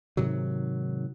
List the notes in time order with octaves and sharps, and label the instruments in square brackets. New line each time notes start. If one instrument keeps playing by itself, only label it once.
[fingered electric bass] G#2 C3 D#3 F#3